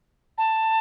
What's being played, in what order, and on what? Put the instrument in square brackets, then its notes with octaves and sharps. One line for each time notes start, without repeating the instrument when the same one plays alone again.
[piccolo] A5